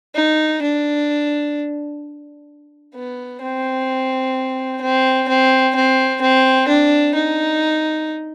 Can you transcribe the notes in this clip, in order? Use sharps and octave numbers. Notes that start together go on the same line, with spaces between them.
D#4
D4
B3
C4
C4
C4
C4
C4
D4
D#4